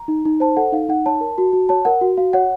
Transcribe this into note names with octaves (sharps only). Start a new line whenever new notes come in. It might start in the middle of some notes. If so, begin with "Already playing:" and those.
Already playing: A#5
D#4
D#4
C5 A5
A4 F#5
D#4 F5
D#4 F#5
C#5 A5
A#4
F#4
F#4
C#5 A5
A#4 F#5
F#4
F#4 F5
C#5 F#5